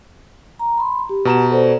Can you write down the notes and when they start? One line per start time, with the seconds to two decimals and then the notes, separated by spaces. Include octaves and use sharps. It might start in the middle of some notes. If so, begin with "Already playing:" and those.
0.59 A#5
0.78 B5 C6
1.09 G4
1.25 B2 A#5 E7
1.51 A4 C5 D5